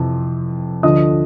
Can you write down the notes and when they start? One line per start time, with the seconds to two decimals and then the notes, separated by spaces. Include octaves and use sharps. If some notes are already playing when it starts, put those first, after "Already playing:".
Already playing: F2 C3 E3
0.83 D2 D3 F3 D#5 D#6